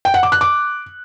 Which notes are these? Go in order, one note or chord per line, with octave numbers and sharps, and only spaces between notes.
G5
F#5
D6
F#6
D6